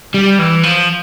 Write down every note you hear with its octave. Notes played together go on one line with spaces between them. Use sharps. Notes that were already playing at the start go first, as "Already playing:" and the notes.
G3
E3
F3